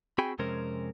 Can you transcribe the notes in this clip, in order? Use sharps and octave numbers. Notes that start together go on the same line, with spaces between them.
C4 F#4 G#4 G5 G#5 B5
F2 C3 G#3 C#4 A#4 C5